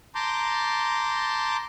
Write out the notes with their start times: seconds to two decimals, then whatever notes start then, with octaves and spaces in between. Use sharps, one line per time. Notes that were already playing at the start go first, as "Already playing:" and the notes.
0.15 A5 A#5 C6 D6 G6